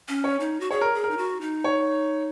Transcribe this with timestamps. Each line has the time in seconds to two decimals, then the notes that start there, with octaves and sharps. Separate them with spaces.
0.09 C#4
0.24 C#5
0.40 D#4
0.60 F#4
0.71 G#4 C#5
0.81 A#4
0.94 G#4
1.04 A#4
1.11 D#4
1.17 F#4
1.41 D#4
1.64 C#5